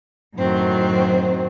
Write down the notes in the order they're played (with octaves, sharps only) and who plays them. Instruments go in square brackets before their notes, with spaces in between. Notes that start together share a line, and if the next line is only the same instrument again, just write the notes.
[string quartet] F#2 A2 D#3 F#3 C4